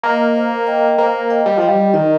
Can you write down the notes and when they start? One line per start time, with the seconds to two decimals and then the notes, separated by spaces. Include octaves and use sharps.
0.03 A#3 A#4 D#5
0.35 C5 F5
0.67 D#5 G5
0.98 A#3 C5 F5
1.30 D#5 G5
1.46 G3
1.57 F3 D#5 G5
1.68 G3
1.93 D#3 A#4 D#5